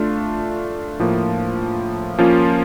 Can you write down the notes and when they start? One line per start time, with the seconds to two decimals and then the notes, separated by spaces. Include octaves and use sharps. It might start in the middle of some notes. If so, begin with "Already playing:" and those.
Already playing: A3 D4 F4
0.99 A2 F3 A#3
2.18 F3 A#3 C#4 F4